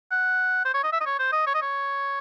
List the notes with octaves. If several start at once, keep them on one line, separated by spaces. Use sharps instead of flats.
F#5
C5
C#5
D#5
E5
D#5
C#5
C5
D#5
C#5
D#5
C#5